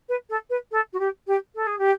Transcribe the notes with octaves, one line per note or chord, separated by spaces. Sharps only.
B4
A4
B4
A4
F#4
G4
G4
A4
G#4
G4